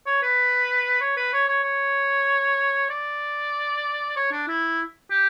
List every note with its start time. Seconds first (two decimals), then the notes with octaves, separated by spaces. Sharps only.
0.06 C#5
0.22 B4
1.01 C#5
1.17 B4
1.33 C#5
1.48 C#5
1.63 C#5
2.90 D5
4.16 C#5
4.32 D4
4.48 E4
5.10 G4